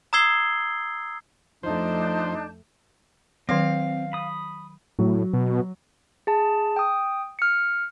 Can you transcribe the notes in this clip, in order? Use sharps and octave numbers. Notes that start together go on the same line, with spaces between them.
A#5 D#6 E6 G#6 C7 G7
F2 F3 A3 D4 D#4 C5 A5 G6
D#3 F#3 C4 F5
B5 D#6
A2 F#3
B2
G#4 A5
G5 D#6
F6 C#7